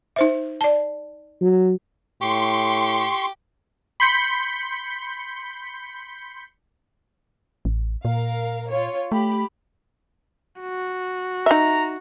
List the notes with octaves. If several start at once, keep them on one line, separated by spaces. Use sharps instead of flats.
D#4 C5 E5
D5 A5
F#3
A2 G4 C6 C#6
B5 C6 G6 B6 C#7
A1
A#2 A#4 F5
F4 C#5
A3 G4 B5
F#4
D#4 E5 A#5